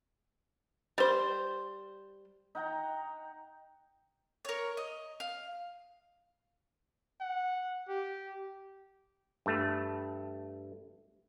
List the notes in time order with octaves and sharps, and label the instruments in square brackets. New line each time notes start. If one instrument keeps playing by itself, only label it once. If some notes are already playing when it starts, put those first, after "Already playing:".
[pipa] G3 C5
[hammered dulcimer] D#4 F#5 G5 A#5
[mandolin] A#4 C#5
D#5
F5
[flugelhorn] F#5
G4
[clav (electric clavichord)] G2 A3